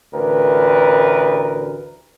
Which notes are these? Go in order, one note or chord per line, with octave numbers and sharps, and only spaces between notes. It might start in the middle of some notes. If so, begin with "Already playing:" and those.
A1 D2 A#4 B4